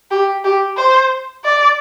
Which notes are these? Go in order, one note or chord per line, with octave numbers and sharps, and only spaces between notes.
G4
G4
C5
D5